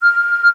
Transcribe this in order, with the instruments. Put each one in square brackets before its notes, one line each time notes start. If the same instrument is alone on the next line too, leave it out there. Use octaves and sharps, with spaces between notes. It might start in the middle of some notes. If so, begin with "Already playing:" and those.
[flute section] F6